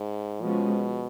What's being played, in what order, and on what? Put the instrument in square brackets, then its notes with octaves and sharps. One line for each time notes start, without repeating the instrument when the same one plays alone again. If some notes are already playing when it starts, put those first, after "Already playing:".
Already playing: [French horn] G#2
[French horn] B2 [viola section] F3 G#3 C#4